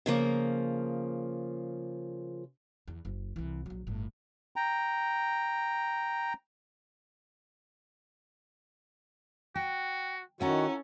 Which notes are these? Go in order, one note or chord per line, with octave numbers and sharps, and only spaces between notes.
C#3 F3 A#3
E2
F#1
C2 E3
A#1 F#3
G1 A2
G5 A#5
F#4 G5
D#3 C#4 E4 F#4 A4 F#5 A#5